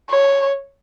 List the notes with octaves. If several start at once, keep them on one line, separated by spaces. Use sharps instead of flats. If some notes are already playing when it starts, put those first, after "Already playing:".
C#5